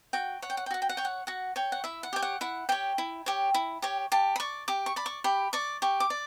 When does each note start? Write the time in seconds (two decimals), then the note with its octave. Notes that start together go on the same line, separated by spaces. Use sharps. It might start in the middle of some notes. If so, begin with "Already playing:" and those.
0.13 F#4 G5
0.42 C#5 F#5
0.50 G5
0.57 F#5
0.66 G5
0.71 F#4 F#5
0.82 G5
0.89 F#5
0.97 C#5 G5
1.05 F#5
1.27 F#4 F#5
1.56 C#5 G5
1.72 F#5
1.84 E4 E5
2.03 F#5
2.13 G4 C#5 G5
2.22 F#5
2.41 E4 F#5
2.69 G4 C#5 G5
2.98 E4
3.26 G4 C#5
3.54 E4
3.82 G4 C#5
4.12 G4 A5
4.36 B5
4.40 D5 C#6
4.68 G4 D6
4.86 C#6
4.96 D5 B5
5.06 C#6
5.24 G4 B5
5.53 D5 C#6
5.82 G4 C#6
6.00 D6
6.10 D5